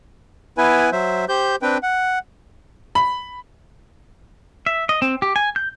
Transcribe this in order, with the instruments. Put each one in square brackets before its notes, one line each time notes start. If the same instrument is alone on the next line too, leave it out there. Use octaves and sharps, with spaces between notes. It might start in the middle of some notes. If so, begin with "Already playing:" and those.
[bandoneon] B3 E4 B4 G#5
F#3 C5 E5
G4 C5 G6
C4 D4 B4 G5
F#5
[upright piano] B5
[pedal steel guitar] E5
D#5
C4
G4
G#5
G6